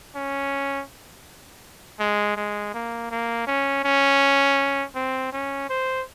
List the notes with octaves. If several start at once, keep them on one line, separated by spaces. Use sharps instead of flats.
C#4
G#3
G#3
A#3
A#3
C#4
C#4
C4
C#4
C5